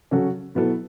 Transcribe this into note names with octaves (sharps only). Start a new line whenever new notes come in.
C#3 F#3 C#4 F#4 A4
B2 F#3 B3 E4 A4